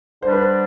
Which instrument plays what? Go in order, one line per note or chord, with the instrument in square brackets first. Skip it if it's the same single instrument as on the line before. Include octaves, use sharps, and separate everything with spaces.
[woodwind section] D3 G3 D4 [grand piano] C5
[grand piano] B4
C5